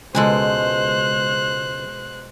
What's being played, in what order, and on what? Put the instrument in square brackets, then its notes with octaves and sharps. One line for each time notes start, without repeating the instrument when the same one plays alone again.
[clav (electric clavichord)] C#2 A4 [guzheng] B2 G#3 G#5 [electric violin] C5 F#6